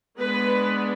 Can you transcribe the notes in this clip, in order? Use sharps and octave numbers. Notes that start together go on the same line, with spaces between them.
G#3 B3 D4 B4